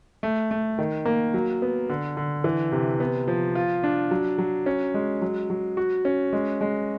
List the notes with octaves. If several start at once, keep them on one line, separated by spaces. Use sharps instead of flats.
A3
A3
D#3
A#3
F#3
B3
D3
D3
E3
C3
B3
F3
F4
D4
F#3
F#3
C#4
G#3
F#3
F#3
F#4
C#4
G#3
G#3